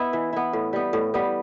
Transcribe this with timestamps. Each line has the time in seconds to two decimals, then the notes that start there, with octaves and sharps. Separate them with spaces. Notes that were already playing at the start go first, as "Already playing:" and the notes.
Already playing: B3 E4
0.13 E3
0.33 B3 E4
0.53 A2
0.73 G3 B3
0.93 A2
1.14 G3 B3